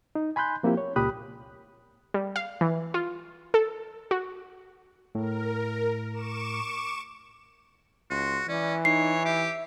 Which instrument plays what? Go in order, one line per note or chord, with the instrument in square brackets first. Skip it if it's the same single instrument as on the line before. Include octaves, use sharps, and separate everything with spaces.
[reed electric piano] D#4
G#5 B5 C6 F#6 G6
F3 A#3 C4 E4 G4
C#5
C#2 A#2 G4 B5 D#6 F#6
[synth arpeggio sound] G3
F5
E3
F4
A4
F#4
[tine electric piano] A2 [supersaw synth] A#4
[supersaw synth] C#6 D6 E7
[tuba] C#2 [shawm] F#4 [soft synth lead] C6
[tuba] E3 [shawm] C#4 [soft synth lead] D5
[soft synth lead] D#4 [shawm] C#5 [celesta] C7
[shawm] G4 [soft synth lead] E5